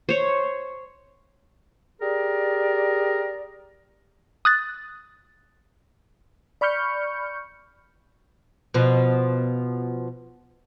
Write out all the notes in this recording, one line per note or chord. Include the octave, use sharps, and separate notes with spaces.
C5 C#5
G4 G#4 A#4 D5
D#6 F#6 A6
D5 B5 C#6 F6 G6 C#7
B2 F3